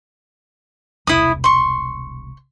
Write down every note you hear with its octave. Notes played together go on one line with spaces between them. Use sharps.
E1 C2 E4 D#6
C6 C#6